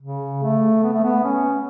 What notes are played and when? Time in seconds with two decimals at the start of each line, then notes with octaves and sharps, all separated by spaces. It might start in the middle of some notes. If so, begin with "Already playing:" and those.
0.02 C#3
0.43 A3
0.83 B3
0.93 A3
1.03 B3
1.24 C#4